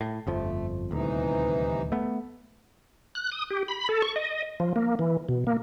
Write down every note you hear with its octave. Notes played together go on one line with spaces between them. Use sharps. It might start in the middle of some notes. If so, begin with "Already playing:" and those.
A2
G1 F2 F3 A3
D#1 D2 C3 E3 D#4
A3 B3
F#6
D#6
G4
B5
A4
C#6
D#5
F3
A#3
E3
B2
A#3